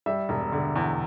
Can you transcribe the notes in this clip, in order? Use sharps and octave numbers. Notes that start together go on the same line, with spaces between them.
G3 E5
E1
D3
E2